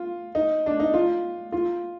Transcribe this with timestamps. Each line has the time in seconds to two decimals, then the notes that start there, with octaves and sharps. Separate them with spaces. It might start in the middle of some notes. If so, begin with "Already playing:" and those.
Already playing: F4
0.35 D#4
0.66 D4
0.80 D#4
0.94 F4
1.52 F4